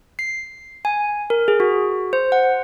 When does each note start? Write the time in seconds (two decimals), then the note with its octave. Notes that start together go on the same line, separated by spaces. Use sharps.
0.19 C7
0.85 G#5
1.30 A#4
1.48 G#4
1.60 F#4
2.13 C5
2.32 F#5